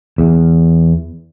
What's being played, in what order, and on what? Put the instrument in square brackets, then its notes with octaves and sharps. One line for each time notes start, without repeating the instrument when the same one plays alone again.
[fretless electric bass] E2